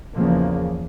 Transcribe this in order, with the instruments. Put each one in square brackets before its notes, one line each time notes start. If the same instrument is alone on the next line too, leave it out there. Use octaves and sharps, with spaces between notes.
[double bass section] E2 C#3 F3 A#3